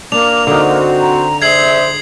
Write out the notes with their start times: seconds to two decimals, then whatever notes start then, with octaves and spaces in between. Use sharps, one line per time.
0.12 A#3 D4 F7
0.47 D3 C4 D#4 F#4
1.00 A#5
1.42 G#4 C5 D5 E5 G#6 C7 F#7